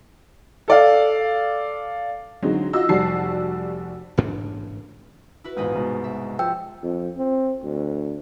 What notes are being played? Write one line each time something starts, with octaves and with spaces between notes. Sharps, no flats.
A4 D5 F5
D3 F#3 G#3 C4 D#4
F4 F#4 D#5 E6
F1 G3 F#4 A5 C7
A1 G#2 B2 D4
E4 F#4 B4
A#1 E2 G#2 G#4 D#5 B5
C2 G#2 B2
E5
F3 G5 E6
F2
C4
D2